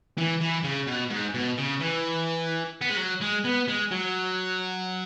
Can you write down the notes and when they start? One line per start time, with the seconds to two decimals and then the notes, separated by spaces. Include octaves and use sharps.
0.18 E3
0.41 E3
0.63 C#3
0.87 B2
1.10 G#2
1.34 B2
1.57 C#3
1.80 E3
2.81 B3
2.89 G#3
2.97 F#3
3.21 G#3
3.44 B3
3.68 G#3
3.91 F#3